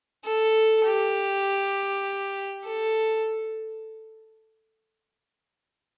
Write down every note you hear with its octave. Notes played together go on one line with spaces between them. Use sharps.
A4
G4
A4